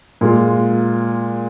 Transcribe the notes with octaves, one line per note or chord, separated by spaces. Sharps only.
A#2 G#3 F4